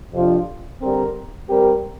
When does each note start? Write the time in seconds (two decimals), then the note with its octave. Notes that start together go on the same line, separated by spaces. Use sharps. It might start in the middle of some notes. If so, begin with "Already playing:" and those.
0.13 F2 C3 F3 D4 F4
0.82 D3 G3 C4 A#4
1.49 G3 C4 G4 A#4